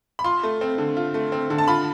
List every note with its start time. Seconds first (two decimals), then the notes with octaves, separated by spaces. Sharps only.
0.19 B5
0.24 F4 C6
0.43 A3
0.61 C4
0.78 D3
0.97 F4
1.14 A3
1.32 C4
1.50 D3
1.58 A5
1.68 F4 B5